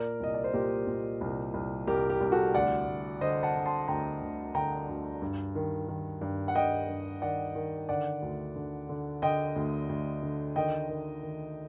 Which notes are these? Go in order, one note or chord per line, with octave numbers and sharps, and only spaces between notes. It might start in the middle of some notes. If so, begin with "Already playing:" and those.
Already playing: A#2 A#4 D5
C2 D#5
D5
C5
A#2 G4 A#4
A#2
C2
C2
C2 G4 A#4
G4
C2
F#4 A4
D2 D5 F#5
D2
D3 C5 D#5
F#5 A5
D3
A5 C6
D2 G5 A#5
D2
D3 G5 A#5
D2
G2
D#3
D#3
G2
F#5
G2 D#5 G5
G2
D#3 D5 F#5
D#3
D3 D5 F#5
D2
D3
D3
D3 D#5 G5
D2
D2
D3
D#3 D#5 G5
D#3
D#3